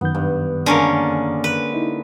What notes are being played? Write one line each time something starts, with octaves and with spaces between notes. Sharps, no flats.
F#2 D#3 B3 G6
G2
D3 G#3 A#3 C#4 A#4
B4
D#4 E4